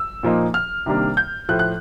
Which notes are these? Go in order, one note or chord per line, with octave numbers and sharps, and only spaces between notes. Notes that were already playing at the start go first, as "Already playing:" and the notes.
Already playing: E6
A#2 F3 A#3 D#4
F6
C3 D#3 G3 A#3 D4
G6
A2 F3 A3 F#6
F#6